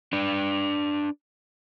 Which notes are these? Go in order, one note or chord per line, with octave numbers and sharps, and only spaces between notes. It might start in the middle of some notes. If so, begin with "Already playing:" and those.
D4 B4